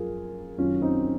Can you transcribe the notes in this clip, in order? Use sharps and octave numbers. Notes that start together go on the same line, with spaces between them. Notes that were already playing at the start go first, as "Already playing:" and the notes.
Already playing: F#2 F3 F4 G#4 A#4
F#2 D#3 F#3 C#4 F4
C4 D#4